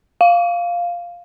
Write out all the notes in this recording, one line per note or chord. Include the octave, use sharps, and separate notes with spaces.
F5